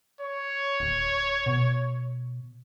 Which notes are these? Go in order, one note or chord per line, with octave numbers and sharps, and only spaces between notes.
C#5
D1
B2